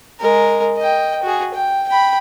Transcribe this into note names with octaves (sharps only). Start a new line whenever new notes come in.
G#3 A#4
D#5 G5
F#4 G#4
G5
G5 B5